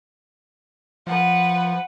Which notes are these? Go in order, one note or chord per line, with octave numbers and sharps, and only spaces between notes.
F3 B4 F#5